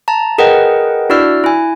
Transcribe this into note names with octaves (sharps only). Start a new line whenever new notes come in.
A5 A#5
G#4 A#4 B4 D#5 F#5 G5
D4 E4 F#4 D5 E6 F6
E4 G#5